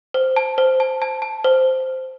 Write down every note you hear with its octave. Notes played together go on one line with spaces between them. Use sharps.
C5
A5
C5
A5
A5
A5
C5